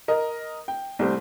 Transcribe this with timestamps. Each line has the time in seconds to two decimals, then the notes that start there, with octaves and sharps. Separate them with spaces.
0.08 A#4 D#5
0.68 G5
0.99 C2 G3 A3 C4